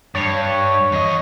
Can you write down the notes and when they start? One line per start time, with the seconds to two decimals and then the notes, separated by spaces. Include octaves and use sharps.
0.15 G2 C#5
0.92 E2 D#5